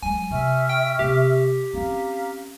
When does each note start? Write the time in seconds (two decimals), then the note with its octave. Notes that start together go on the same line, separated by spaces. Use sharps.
0.03 F#3 G#3 G#5
0.30 C3 E5 C#6 F6
0.69 G5
0.99 C3 B3 G4
1.74 C4 C#4 F5 A#5